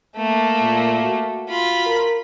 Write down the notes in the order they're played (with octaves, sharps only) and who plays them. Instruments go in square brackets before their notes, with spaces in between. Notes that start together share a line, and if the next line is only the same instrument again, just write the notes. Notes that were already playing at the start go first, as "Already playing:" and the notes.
[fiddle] A3 A#3
[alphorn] A#2
F#4
[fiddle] F4 B5
[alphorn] A#4